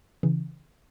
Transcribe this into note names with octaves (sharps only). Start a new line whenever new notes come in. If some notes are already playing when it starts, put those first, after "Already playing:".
C#3 E3